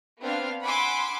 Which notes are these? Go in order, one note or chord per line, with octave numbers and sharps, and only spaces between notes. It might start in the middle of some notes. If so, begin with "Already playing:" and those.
B3 C4 D4 F5
F#5 G#5 B5 C6 D6 E6